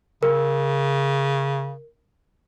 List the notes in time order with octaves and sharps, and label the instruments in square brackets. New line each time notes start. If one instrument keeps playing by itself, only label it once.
[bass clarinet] C#3 [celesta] A#4